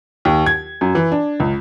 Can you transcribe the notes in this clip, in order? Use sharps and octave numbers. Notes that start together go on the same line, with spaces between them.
D#2
G#6
F#2
E3
D4
C#2